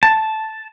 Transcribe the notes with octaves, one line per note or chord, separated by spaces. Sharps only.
A5